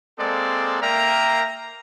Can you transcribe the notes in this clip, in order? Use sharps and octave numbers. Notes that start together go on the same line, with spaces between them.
G#3 A#3 C4 A4 D5
A#3 A#4 E5 G5 A#5